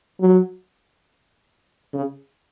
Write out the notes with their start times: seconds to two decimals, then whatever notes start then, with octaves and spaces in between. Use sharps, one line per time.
0.20 F#3
1.94 C#3